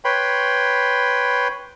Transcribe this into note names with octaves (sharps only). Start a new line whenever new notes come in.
B4 C#5 G5 B5 C6